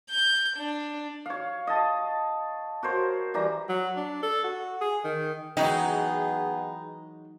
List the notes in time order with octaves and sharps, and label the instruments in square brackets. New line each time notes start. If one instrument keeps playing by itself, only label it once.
[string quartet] G6
D4
[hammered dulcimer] C#5 F5
D#5 A5
F#4 A#4 C5 C#5
E3 G3 A#5
[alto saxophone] F#3
D4
A4
F#4
G#4
D#3
[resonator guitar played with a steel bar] E3 F#3 G#3 [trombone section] B3 G#4 [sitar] D#4 [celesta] G5